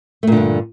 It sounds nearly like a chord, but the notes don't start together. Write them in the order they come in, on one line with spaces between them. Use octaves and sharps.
A3 A#2 D3 G2